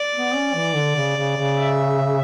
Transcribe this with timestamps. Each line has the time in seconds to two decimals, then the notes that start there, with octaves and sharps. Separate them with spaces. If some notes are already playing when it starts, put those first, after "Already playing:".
Already playing: D5
0.15 B3
0.35 C#4
0.55 E3
0.75 D3
0.96 C#3
1.17 C#3
1.37 C#3
1.58 E5